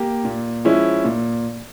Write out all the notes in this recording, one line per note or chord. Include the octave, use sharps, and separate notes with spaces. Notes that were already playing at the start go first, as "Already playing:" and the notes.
Already playing: A#3 G4
A#2
F3 G#3 C#4 E4
A#2